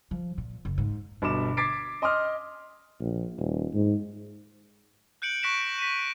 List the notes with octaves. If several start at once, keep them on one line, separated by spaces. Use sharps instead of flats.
F3
A#2
F#1
G#2
G1 B2 B5 D6 E7
D6 G#6 A6 B6 C7 D7
D#5 C6 D6 D#6 F6
A#1
D#1
G#2
F#6 G6 C#7 D7 F#7
C#6 F#6 A#6 B6 D7 E7
B6 D#7